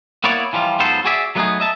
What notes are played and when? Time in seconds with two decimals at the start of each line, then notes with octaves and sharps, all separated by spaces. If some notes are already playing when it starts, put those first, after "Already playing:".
0.24 A#3 B3 E4 C#5 D5
0.53 E3 F3 G3 F4
0.79 G#2 F#3 B3 F4 A4 C5
1.05 F#4 G#4 D5 E5
1.35 F#3 A3 B3 D4 D#4 G#4
1.60 D#5 E5 A5